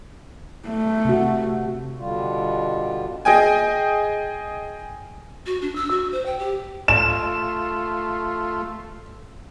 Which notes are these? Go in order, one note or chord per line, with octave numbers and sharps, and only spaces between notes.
A3
C3 F#4
B2 D3 G3 F4
G#4 D#5 G5 G#5
F#4
D4
E6
F#4
C5
G5
G4
A3 F4 E7